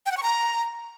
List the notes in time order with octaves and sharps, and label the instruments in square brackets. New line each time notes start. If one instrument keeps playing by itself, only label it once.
[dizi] G5
F#5
C#6
A#5